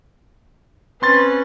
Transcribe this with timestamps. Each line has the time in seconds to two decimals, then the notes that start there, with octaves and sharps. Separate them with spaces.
1.02 C4 C#4 B4 C6 A6